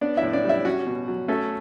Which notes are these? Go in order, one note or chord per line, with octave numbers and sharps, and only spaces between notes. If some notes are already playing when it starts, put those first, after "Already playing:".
B3 D4 D5
E4 E5
A2
D4 D5
G3
E4 E5
C#4 F#4 F#5
B2
F#3
A3 C#4 A4